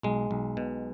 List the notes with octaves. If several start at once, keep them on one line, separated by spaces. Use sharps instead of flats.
B1 G#3
B1
B2